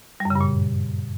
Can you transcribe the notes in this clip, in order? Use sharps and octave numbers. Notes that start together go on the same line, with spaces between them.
G3
F#2
C#3
G2
A#2